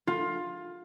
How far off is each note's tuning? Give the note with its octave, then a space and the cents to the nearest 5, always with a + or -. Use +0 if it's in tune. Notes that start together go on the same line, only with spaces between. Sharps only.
F4 +15